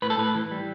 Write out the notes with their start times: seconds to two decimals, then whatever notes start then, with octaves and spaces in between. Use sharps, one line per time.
0.02 A2 B4
0.10 A4
0.18 A2 B4
0.35 E3
0.52 G3